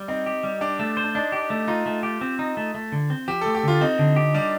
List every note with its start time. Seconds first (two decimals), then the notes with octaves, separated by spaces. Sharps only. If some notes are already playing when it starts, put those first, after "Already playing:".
Already playing: G3
0.08 C4 D#4
0.26 G4
0.44 G3
0.61 D4 G4
0.79 A3
0.97 C5
1.04 D4
1.15 D4 D#4
1.32 G4
1.50 A3
1.68 D#4 F4
1.86 A3
2.03 G4
2.21 C4
2.39 D#4
2.57 A3
2.74 A3
2.92 D3
3.10 C4
3.28 F3 G4
3.41 A4
3.46 A3
3.55 G4
3.63 D3 F4
3.81 C4 D#4
3.99 D3
4.16 G4
4.34 G3 D4